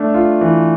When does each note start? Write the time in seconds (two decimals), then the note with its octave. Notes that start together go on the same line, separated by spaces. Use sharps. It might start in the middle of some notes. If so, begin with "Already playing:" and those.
Already playing: A3 D4
0.14 F4
0.41 E3